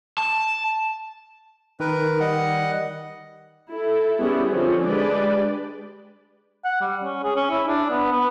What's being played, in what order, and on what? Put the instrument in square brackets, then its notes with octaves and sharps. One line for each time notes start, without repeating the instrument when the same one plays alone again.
[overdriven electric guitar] A5
[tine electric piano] D#3 [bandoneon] A#4 B4
[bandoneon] G3 D#5 F#5
[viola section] E4 A4
G3 B3 C#4 E4 G4 G#4
D3 F3 C4 C#4
G#3 D4 G4 B4 D5
[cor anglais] F#5
G3
C#4
G#4
C#4
E4
D4
B3
B3